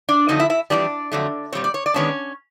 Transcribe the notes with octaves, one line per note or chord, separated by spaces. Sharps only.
D4 D5
F2 D3 F#3 A3 D#4 D#5
E4 E5
E4 E5
F2 C3 E3 G3 D4 D5
F2 D3 F#3 A3
A#2 G3 C4 C#5
D5
C#5
D5
D#3 G#3 B3 C#4 D4 C#5